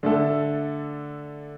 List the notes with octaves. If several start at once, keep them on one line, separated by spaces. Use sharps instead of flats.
D3 A3 A4